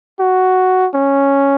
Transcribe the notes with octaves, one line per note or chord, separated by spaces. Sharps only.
F#4
C#4